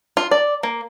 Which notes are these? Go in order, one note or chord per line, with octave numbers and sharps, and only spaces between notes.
F4
D5
A#3